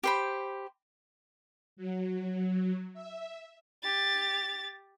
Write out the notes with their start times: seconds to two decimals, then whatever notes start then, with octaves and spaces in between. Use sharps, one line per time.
0.03 G4 C5 B5
1.76 F#3
2.93 E5
3.82 G4 A6